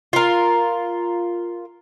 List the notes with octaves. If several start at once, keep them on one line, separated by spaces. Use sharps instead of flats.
F4 A#4